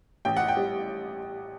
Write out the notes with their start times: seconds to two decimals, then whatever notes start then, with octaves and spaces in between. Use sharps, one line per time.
0.25 A1 G5
0.37 F#5
0.48 G5
0.57 G3